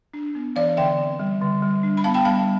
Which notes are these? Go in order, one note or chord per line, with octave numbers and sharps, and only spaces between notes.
D4
B3
E3 D5 F5
D3 E5 G5
C4
G3
D3
G3
D4
B5
B3 F5 A5
G5 B5
G3 F5 A5